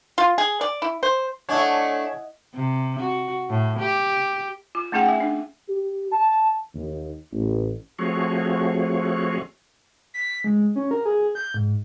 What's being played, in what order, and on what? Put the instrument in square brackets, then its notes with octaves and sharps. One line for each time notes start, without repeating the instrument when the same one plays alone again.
[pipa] F4
G#4
D5
E4
C5
[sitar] A3 D4 [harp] E4 D#5 F#5 [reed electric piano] C#5 G#5 G#6
[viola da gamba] C3
F#4
A2
G4
[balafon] F4
A3 C#4 D#4 G#4 F#5 G5
E5 G#5
D4
[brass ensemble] G4
A5
D#2
A1
[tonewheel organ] F3 A3 C4 F#4 G#4 C#5
[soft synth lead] B6
G#3
C#4
A#4
G#4
G6
G#2